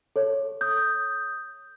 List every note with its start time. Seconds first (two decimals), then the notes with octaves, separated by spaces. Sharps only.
0.16 A4 C#5
0.61 D#6 G6